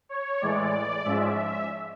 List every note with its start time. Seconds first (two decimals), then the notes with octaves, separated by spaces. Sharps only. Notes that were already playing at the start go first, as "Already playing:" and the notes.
0.09 C#5
0.41 A2 E3 G#3 D5
1.05 G#2 F3 G#3 C#4 E5